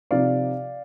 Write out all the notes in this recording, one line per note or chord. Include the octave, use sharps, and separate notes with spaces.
C3 F3 C4 D#4 D5 F5